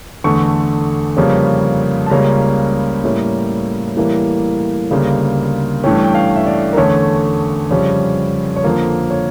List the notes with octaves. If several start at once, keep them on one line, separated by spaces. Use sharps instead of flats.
E2 D3 A3 C#6
F2 C#3 G3 A#3 C#4
A5
C#2 C#3 G3 A#3 C#4 A#5
A2 G3 A#3 C#4
A2 E3 G3 A#3
D2 C#3 G3 A#3
G2 E3 A3 C#4 G5
G5
F5
E5
D5
A#4
E2 D3 A3 C#4 C#5
F2 C#3 G3 C#4
C#5
F2 D3 F3 A#3 A#4
C#5